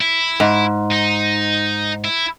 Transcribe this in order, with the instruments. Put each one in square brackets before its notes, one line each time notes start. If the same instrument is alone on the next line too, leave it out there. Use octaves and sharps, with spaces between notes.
[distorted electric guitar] E4
[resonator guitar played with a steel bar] G#2
[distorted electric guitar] D#4
E4